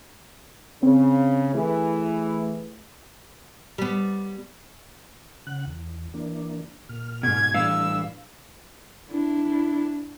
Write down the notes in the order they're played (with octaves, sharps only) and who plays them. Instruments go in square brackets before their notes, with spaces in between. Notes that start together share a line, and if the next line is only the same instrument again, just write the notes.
[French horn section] C#3 [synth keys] C4
[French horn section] E3 [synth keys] A3 G#4
[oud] G3 B3
[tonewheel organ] C#3 F#5 F#6
E2
E3 A#3 D4
A#2 F6
[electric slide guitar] G#2 B2 [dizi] G#6
[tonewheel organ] A2 E3 D4 [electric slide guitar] G3 B4 F5 [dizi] E6
[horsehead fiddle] D4 E4